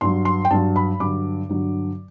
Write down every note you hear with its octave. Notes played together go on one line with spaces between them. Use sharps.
G2 F#3 C6
C6
G5
G2 F#3 A5
B5
G2 D3 F#3 D6
G2 D3 F#3